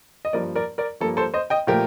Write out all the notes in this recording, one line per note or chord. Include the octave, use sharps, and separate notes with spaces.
D#5
G2 F3 A#3 A#4 D5
A#4 D5
A#4 D5
G2 F3 A#3 A4
A4 C5
C5 D#5
D#5 G5
A#2 F3 A3 G4 A#4